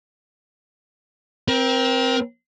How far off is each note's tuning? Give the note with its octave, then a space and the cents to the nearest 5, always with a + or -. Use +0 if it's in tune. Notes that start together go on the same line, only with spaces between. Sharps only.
C4 +0 A#4 +35